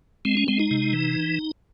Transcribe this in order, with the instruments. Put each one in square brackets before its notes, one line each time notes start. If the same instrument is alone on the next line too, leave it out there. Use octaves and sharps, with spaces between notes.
[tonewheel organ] G#3 C4
C#4
G#3 C4
D#4
C3
E3